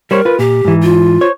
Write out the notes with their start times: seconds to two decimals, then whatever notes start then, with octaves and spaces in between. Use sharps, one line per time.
0.11 G3 A#4 C5 C#5
0.25 F4 B4
0.39 A#2 G4
0.65 G#2 E3
0.83 F4
1.21 C5 C#5